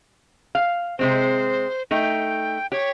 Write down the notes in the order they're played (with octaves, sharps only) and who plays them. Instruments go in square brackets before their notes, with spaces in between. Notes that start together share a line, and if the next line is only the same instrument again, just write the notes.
[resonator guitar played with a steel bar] F5
[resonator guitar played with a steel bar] C3 G#3 C4 [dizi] C5
[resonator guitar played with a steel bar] A3 D#4 [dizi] G5
[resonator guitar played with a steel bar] G4 [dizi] C#5